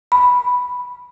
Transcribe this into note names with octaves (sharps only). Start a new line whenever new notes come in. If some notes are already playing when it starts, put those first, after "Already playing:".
B5